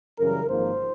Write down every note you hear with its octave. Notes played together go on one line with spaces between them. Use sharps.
F#2 C#3 E3 G3 A#4
G#1 G#2 F3 A#3 C5